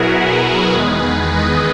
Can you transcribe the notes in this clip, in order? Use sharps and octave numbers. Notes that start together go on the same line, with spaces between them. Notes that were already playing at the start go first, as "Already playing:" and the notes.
Already playing: B2 F#3 B3 E4 F#4 G#4 A#4
G#4 B4
E2 D#3 G#3 B3 G#4 B4
B4 D#5